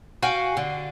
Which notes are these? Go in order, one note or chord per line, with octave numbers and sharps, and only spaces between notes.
F#4 F5 G5 G#5
D3